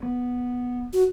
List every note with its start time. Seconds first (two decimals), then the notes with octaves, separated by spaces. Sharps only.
0.03 B3
0.93 F#4